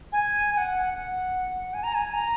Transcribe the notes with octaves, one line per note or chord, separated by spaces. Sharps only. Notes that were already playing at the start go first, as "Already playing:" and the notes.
G#5
G#5
F#5
F#5
G#5
A#5
G#5
A#5